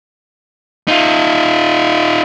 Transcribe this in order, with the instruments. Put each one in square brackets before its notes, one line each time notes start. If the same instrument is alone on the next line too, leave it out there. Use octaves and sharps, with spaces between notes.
[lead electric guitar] D#4 F4